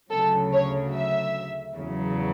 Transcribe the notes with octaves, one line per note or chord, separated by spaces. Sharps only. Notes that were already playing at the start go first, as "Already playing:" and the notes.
D2 C#3 F#3 A4
C#5
E5
E2 C#3 F#3